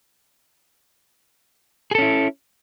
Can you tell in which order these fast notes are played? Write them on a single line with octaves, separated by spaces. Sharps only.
G#4 A4 C#4 E4